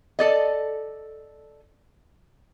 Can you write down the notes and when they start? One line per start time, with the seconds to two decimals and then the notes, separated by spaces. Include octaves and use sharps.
0.19 A4 D5 D#5